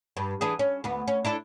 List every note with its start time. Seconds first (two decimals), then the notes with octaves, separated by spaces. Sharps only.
0.17 G2
0.41 E3 D4 G#4
0.59 C#4
0.84 D2 B3
1.08 C#4
1.25 D4 E4 A4